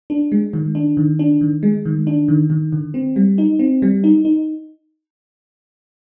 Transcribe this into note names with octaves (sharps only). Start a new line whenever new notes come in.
D4
G#3
D#3
D4
D#3
D4
D#3
G#3
D#3
D4
D#3
D#3
D3
C4
G3
D#4
C4
G3
D#4
D#4